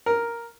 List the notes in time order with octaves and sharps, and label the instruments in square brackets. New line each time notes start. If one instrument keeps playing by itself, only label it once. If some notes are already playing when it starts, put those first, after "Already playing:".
[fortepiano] A#4